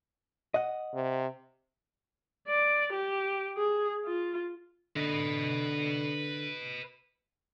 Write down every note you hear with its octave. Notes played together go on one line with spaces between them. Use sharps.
D#5 F#5
C3
D5
G4
G#4
F4
D3 B4 D#5